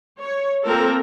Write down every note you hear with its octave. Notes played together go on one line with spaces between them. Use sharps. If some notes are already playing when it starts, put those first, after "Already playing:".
C#5
A#3 C4 F4 A4 A#4